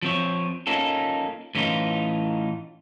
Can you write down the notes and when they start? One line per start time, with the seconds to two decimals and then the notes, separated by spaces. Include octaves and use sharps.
0.03 F3 C4 C#5
0.67 A#3 C#4 D#4 F4 A4
1.55 A2 E3 C#4 D#4 F4